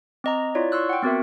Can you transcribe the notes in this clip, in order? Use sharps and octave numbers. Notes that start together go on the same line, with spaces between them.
C4 D#5 A#5
E4 F4 C#5 D5
C6 C#6 E6 F#6
F#5 G5
B3 C4 F#4 A#4 E5